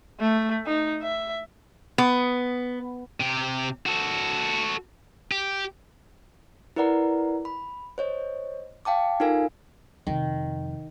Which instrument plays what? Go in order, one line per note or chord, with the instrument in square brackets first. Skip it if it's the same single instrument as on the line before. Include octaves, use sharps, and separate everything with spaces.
[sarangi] A3
D#4
E5
[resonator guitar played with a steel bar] B3
[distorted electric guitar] C3 G4
F#4 A4
G4
[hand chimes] E4 A#4 B4 D5 F#5 A#5
B5
C5 C#5 D#5
F5 G5 A5 D6
D#4 F4 A4 A#4 F5 G#5
[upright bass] F2 C3 [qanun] D#3